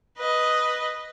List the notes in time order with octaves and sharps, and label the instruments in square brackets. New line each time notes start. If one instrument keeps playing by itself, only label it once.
[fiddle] B4 D#5